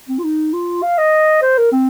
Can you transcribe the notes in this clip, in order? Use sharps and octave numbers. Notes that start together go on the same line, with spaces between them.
C4
F4
D#4
F4
F5
D#5
C5
A#4
C4